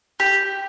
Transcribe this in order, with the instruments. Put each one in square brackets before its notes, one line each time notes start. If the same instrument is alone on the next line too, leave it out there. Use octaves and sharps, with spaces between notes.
[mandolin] G4